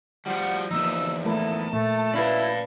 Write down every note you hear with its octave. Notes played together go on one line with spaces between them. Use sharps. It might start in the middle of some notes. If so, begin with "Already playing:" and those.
F3 G3 F#5
E2 F3 A#3 D#4 E6
A3 A#3 E4 A#4 A5
A#2 A3
C#4 E4 B4 D5 F5